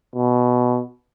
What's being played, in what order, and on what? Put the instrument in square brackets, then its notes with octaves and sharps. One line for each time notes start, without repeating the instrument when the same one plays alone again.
[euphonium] B2